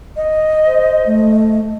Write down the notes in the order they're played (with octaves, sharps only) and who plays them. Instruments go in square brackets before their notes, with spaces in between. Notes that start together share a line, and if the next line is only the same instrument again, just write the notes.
[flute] D#5
[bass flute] C5
A3